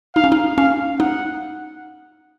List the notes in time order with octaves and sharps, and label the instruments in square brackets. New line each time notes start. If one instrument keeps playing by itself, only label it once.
[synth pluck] D#4 [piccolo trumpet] F5
[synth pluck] C#4
D#4
[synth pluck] C#4 [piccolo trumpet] F5
[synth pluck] D#4 [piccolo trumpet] F#5